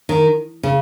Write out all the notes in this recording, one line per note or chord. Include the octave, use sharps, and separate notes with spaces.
D#3
C#3